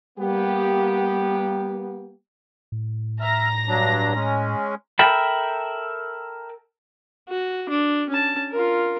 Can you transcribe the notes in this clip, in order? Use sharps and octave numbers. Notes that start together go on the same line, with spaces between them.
G3 A#3 B3 G4
A2
E5 A#5 F6 A#6
G2 F#3 D4
G#3 C#4
A4 A#4 E5 G5 B5
F#4
D4
C#4 A5
F4 A#4